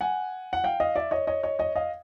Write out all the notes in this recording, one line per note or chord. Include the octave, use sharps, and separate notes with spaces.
F#5 G#5
F#5
F5 G5
D#5 F5
D5 E5
C#5 D#5
C#5 D#5
C#5 D#5
C#5 D#5
D#5 F5